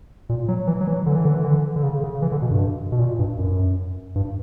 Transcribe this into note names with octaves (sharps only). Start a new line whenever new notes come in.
A#2
F#3
E3
F#3
E3
D3
E3
D3
E3
D3
D3
C#3
C#3
E3
D3
B2
G2
B2
A#2
G2
F#2
G2